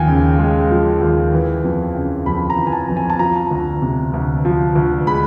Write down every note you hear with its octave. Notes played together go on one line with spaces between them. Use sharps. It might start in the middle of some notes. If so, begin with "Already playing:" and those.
Already playing: D#2 F3 G5 G#5
C#3
G#3
F3
D#2
E3
F2
C#3
F2 B5
A#5
E3
G#5
A5
F2
G#5
A5
F3 A#5
D2
C3
D2
F3
D2
G#3 B5